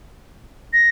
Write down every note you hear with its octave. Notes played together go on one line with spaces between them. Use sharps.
A#6